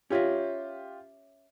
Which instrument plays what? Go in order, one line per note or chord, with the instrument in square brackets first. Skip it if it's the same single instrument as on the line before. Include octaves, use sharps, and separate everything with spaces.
[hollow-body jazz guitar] C#4 C#5 E5 [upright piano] F4 G4